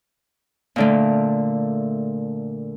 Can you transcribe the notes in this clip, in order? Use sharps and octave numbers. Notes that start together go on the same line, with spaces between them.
A#2 D3 A3